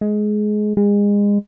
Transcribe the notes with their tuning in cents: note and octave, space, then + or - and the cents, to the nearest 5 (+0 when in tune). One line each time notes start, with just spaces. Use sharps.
G#3 +20
G#3 -30